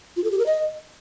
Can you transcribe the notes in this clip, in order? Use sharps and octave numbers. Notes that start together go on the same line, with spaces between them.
F4
A4
G4
A#4
D#5